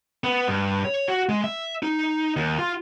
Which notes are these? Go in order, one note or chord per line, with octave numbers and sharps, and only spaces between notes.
B3
G2
C#5
F#4
G#3
E5
D#4
D#2
F4